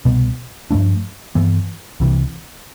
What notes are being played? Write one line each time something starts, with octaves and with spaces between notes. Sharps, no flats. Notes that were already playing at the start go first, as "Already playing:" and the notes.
C2 B2 B3
G2 F3 A3 D4
G2 E3 B3
C2 C3 E3